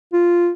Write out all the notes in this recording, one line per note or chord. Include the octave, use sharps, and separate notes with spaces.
F4